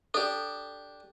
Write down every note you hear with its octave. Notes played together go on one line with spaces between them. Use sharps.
D4 G4 A4